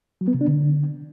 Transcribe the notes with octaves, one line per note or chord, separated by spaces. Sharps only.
F#3
B3
C3
D4
D3